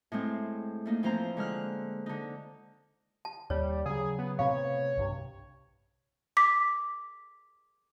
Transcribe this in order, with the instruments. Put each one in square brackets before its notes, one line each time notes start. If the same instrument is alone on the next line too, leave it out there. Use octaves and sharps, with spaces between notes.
[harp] A2 G#3 C4
A3 A#3 D#4
E3 F3 C4 C5 A#5
D3 G#3 F6 F#6
D3 D#4
[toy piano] A5
[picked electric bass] D#2 [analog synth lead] G3 [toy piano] C#5
[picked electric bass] C#3 F#3 [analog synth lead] G#4
[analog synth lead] B3
[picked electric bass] A2 C3 B3 [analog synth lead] C#5 [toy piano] F5
[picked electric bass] B1 G2 C3
[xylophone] D6 B6